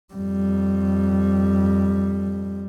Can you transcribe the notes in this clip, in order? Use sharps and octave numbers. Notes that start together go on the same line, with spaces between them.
F2 G3